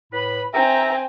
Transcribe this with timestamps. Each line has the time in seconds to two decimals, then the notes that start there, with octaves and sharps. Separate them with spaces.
0.13 A2 B4 B5
0.54 C4 E5 G5 G#5 A#5